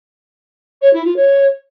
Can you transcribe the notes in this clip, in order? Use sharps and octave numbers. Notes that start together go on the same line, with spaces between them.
C#5
E4
F4
C#5